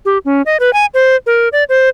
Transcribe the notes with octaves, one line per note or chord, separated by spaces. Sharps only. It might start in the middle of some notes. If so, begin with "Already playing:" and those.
G4
C#4
D#5
B4
G#5
C5
A#4
D5
C5